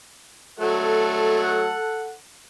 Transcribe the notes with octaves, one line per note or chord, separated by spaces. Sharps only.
F#3 A3 A4 F#5